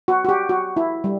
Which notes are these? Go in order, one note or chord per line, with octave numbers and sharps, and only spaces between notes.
F#4
F#4
G4
F#4
E4
G3